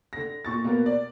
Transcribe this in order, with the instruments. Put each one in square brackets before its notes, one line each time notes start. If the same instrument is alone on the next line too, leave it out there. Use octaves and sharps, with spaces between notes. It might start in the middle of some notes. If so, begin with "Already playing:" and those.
[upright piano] D3 A#6
A#2 C#6 A6
B2 A#3 B3 A#4
D5